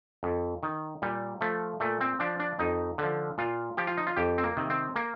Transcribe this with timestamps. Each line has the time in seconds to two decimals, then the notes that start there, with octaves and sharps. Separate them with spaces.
0.23 F2
0.63 D#3
1.02 A#2 G3
1.41 F3 A3
1.80 A#2 A3
2.01 C4
2.20 F3 D4
2.40 D4
2.59 F2 D#4
2.98 D3 F3
3.38 A#2 F4
3.77 F3 G4
3.87 F4
3.97 D#4
4.07 F4
4.16 F2 G4
4.38 C4
4.44 A#3
4.57 C3 D#3
4.70 C4
4.96 A#3